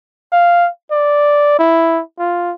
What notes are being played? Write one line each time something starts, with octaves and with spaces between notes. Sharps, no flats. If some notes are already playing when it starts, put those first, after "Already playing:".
F5
D5
E4
F4